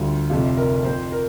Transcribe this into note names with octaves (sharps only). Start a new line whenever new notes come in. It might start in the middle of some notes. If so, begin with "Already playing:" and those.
Already playing: D2 D3 G3 F4
F1 F2 C3 F4
A#4
F2 F3 C5
A#4